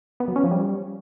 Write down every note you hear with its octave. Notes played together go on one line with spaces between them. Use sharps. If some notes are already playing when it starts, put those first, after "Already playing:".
B3
F#3
C#4
F3
G3